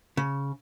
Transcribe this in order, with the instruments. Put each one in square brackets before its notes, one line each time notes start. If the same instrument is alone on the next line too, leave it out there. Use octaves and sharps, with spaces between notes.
[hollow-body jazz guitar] C#3